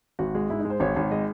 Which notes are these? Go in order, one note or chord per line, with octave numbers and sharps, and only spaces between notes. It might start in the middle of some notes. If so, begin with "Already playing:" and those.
G#1 F#4
G#3
G#2 E4
D#4
G#3
C5
G#1 C#5
G#1
G#3 D#5